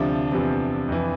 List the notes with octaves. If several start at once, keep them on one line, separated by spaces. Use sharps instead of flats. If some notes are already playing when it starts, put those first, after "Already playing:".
Already playing: D2 C3 F3 D4
E2 C3 F3
F2 E3